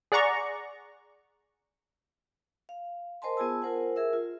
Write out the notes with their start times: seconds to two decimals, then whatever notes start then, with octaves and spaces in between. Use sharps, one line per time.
0.12 G#4 D5 F#5 A#5 C#6
2.69 F5
3.22 A#4 C5 D#5 G#5 A5 C6
3.37 B3 F4 G#4 G#5 A5 E6
3.62 F4 A#4 C5 F#5 G#5
3.96 G#4 A#4 E5 E6
4.13 F4